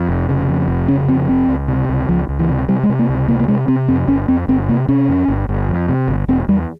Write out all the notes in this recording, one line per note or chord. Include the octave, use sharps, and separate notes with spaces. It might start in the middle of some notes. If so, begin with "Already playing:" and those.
Already playing: F2
F1
C#3
F2
F1
C#3 C#4
F2 C4
F1 C4
C#2
C3
C#2
C#2 F3
C#2
E3
C3
C3 G3
G#3
C3
A#3
C#2
C3 A#3
A#3
C3 G#3
C3 C4
F2 C4
G1 C#4
F2 C4
G1 C4
C3 A#3
C3 C#4
F2
G1
G1
F2
C3
G1
E1 C4
E2 G3